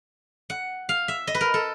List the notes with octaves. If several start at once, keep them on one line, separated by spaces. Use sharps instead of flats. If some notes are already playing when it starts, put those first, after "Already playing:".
F#5
F5
E5
D#5
B4
A#4
A4